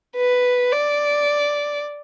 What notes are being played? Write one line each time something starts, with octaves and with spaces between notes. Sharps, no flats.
B4
D5